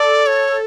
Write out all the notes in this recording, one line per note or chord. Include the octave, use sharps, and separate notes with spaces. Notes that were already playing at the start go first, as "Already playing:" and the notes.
Already playing: A4 D5
C#5